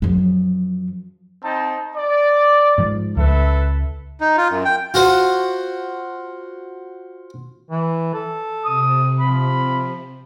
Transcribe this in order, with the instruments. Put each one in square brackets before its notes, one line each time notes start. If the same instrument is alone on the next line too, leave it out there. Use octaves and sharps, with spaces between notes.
[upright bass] F#2 F3
[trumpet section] C4 D#4 A5
D5
[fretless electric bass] G#2 F3
[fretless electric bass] C#2 [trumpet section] A4 B4 E5
[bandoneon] D#4
F4
F#2
G5
[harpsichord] F4 F#4 C5
[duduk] E3
A4
[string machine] C3 [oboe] D#6
[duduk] F3 [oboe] B5